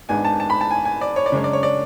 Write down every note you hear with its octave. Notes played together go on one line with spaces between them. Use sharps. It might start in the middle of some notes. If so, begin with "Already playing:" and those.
G#1 G#2 G#3 B3 D4 G#5
A5
A5
B5
A5
G#5
G#5
D5
C#5
D5
F#2 C#3 G#3 D4 C#5
D5
C#5
D5